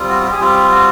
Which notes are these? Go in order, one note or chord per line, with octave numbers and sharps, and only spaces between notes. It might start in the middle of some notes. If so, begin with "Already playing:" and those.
Already playing: G3 C4 F4
F#4
G4
G#4
G3 C4 F4 G4
F#4